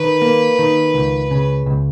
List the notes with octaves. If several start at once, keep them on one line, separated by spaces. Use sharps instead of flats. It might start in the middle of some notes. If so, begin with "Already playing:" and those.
Already playing: D#3 B4
A#3
D#3
C#2
C#3
C#2